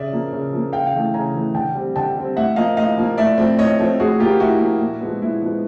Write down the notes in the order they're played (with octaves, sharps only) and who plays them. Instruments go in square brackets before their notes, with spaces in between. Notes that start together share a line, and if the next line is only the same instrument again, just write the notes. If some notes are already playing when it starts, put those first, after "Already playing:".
Already playing: [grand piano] C#3 D5 E5
F3 A#3
C#3
F3 A#3
C#3 F5 G5
F5 G5
E3 A3
C#3 G#5 A#5
E3 A3
D3 G5 A5
G3 C4
D3 G5 A5
G3 C4
A2 E5 F#5
F3 A#3 D#5 F5
A2 D#5 F5
F3 A#3
A2 D5 E5
F3 A3 C4
A2 C#5 D#5
F3 A3 C4
A2 F#4 G#4
F3 A#3 F4 G4
A2 E4 F#4
F3 A#3
A#2
F3 G#3 B3
A#2 E4
F3 G#3 B3